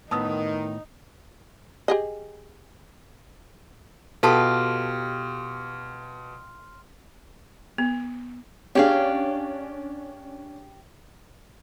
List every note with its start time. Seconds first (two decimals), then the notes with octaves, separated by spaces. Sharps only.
0.11 A2 D#3 B3 D#4 A5 D#6 E6
1.88 G4 G#4 D#5
4.23 B2 F4 G4 A4 A5 C6 F6
7.78 B3
8.75 C#4 D4 G4 G#4 F5